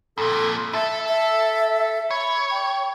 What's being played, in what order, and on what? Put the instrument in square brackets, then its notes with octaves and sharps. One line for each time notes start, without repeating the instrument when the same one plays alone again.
[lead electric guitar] F2 A#2 [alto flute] A4
[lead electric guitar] A4 A5 [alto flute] E5
[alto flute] E5
[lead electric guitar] C#5 [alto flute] B5
[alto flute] G5